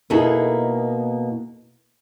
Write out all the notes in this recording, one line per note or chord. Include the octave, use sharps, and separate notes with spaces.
B2 A#3 D#4 E4 G#4 A4